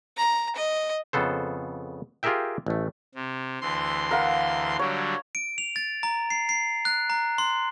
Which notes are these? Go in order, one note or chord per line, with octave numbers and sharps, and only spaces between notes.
A#5
D#5
F2 C#3 B3 A4 C5
F4 G4 G#4 A#4 E5 G5
A1 A3
C3
D2 E3 C6
A#4 F5 F#5
D3 F#3 G3 C#5
D7
F7
A6
A#5
C7
C7
F#6
A#5
C6